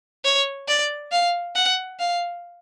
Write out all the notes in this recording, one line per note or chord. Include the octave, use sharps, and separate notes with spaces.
C#5
D5
F5
F#5
F5